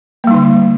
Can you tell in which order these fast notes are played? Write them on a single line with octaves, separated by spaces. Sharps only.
A#3 G3 D#4 D3